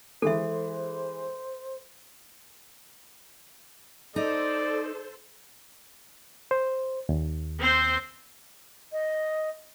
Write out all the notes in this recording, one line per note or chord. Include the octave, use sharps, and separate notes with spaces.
E3 G#3 A4 C5 E5
D#4 A4 C5 D5
C5
D#2
C4 C5
D#5